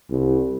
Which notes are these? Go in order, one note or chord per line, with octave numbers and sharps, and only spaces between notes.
C2